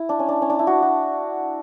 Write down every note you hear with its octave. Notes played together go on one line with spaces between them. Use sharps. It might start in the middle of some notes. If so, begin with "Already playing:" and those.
Already playing: E4
D4
C#4
D4
C#4
D4
E4
F#4
F#4